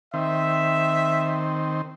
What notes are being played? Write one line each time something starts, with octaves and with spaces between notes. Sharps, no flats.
D#3 C4 E5